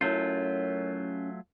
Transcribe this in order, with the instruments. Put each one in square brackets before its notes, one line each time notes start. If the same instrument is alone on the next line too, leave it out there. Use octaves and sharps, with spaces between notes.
[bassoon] F#2 [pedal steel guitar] F#3 A3 F4 [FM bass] C#4 [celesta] E4 C#5 G6